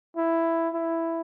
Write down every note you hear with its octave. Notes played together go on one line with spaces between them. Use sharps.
E4
E4